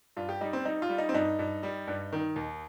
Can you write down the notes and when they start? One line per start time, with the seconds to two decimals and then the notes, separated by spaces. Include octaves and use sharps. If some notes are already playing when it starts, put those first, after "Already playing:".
0.17 G2 F4
0.29 G4
0.41 G3 D#4
0.53 C4
0.65 G3 D#4
0.82 F4
0.89 G3
0.98 D#4
1.09 C4
1.14 G2 D#4
1.39 G2
1.63 G3
1.88 G2
2.12 D#3
2.36 D#2